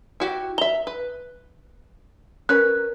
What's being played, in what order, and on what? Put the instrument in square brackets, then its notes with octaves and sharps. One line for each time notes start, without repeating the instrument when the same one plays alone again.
[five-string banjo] E4 F#4 G4
[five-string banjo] E5 A#5 [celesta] G7
[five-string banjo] B4
[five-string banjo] C#4 B4 [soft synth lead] A#4 [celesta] F#6